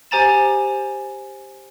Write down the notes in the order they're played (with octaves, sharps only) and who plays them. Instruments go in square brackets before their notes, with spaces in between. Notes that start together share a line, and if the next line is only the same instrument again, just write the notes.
[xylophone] G4 C5 G#5 A#5 A6 E7